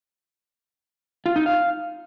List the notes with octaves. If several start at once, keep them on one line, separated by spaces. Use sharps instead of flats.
F4
D#4
F5